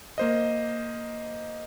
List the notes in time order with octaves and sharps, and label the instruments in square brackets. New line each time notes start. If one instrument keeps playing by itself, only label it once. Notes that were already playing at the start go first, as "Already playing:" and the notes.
[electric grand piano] A#3 C5 D#5